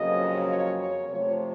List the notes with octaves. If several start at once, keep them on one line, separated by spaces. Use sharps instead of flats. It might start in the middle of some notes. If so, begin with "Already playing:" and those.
Already playing: F2 C#3 F#3 A#3 D#5
C#5
C#5
C3 F3 A3 C#5